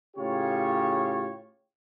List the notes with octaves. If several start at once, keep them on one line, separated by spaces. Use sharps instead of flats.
A2 C#3 F4 G4 C#5